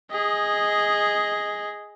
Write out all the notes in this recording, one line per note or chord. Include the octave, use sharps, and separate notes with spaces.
G#4 D#5